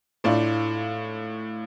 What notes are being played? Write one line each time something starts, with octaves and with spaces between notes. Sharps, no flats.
A2 A3 D4 F4